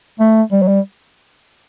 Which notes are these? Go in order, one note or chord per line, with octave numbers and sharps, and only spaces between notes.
A3
G3
F#3
G3